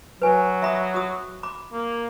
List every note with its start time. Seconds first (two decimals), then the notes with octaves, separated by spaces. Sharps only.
0.22 F#3 B4 G#5
0.62 E5 B5 D#6
0.94 F#4 D#6
1.43 B5 D6
1.73 A#3